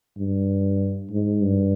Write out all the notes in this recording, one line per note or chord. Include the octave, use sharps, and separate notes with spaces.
G2
G#2
G2